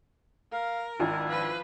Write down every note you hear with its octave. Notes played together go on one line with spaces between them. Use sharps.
A#4 F5
G#1 D4 E4 F4
F3 B4